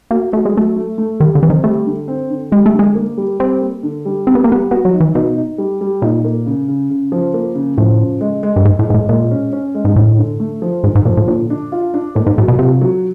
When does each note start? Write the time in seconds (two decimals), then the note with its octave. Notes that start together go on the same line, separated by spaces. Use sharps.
0.11 A#3 F#4
0.32 A3 F#4
0.45 G#3
0.55 F#3 A3
0.76 A3
0.98 A3
1.20 D#3 G3
1.35 D3
1.42 E3 C4
1.50 D#3
1.64 G3 A3
1.86 D3
2.08 C4
2.30 D3
2.51 G3 G#3
2.66 A3
2.73 D3
2.79 G#3
2.95 A#3
3.18 G3
3.39 G3 C4
3.61 A#3
3.83 D3
4.05 G3
4.27 G3 C4
4.35 B3
4.44 A#3
4.49 G3 B3
4.71 B3 F#4
4.85 F#3
4.93 D#4
5.00 E3
5.15 B2 D#4
5.37 D#4
5.58 G3
5.81 G3
6.02 A#2 D#4
6.24 A#3
6.46 C#3
6.68 C#3
6.90 C#3
7.12 F3
7.34 A#3
7.55 C#3
7.77 A2 F3
7.99 C#3
8.21 G#3
8.43 G#3
8.56 G2
8.64 G#2 G#3
8.79 A2
8.88 G#2 G#3
8.94 A2
9.09 A#2 G#3
9.31 C#4
9.53 C#4
9.75 G#3
9.85 G#2
9.96 A2 D3
10.18 D3
10.40 A3
10.62 F3
10.84 G#2 D3
10.95 G#2
11.05 A#2 F3
11.17 A2
11.28 A#2 D3
11.50 D4
11.72 F4
11.94 D4
12.15 A2 A#3
12.26 G#2
12.38 A2 F#3
12.48 B2
12.59 C3 F4
12.81 F#3